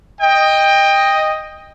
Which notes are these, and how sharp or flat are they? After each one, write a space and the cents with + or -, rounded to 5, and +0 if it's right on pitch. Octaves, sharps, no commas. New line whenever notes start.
D#5 +0 G5 +20